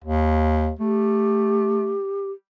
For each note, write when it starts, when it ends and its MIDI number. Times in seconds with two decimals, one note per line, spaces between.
0.04 0.71 39
0.79 1.98 57
0.79 2.31 67